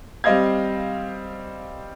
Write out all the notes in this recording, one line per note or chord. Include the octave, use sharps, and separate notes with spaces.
G3 C4 D#5 F5 G#6